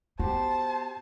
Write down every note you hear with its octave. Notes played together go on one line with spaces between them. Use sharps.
B3 F#4 G4 C5 A5